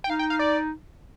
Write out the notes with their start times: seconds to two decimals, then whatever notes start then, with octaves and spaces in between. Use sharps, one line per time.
0.04 G5
0.09 D#4 F5
0.19 G5
0.30 F5
0.39 D5